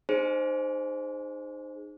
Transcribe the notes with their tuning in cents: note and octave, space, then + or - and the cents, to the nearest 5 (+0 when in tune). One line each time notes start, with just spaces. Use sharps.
D#4 -25 G#4 +0 C5 +0